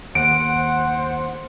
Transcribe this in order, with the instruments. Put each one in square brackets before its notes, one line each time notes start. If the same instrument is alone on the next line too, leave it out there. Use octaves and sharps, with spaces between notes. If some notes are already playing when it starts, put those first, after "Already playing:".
[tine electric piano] D#2 [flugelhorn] C5 [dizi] F#5 [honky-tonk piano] D7